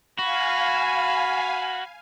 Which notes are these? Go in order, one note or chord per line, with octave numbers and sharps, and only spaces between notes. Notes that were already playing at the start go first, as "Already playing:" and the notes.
F#4 F5 G#5 B5